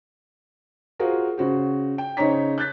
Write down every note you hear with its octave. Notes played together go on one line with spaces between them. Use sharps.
F4 F#4 G#4 A#4 C5
C#3 F#4 C5
G5
C#3 D#4 C5 C#5 A#5 B6
F#6 G6 A6 B6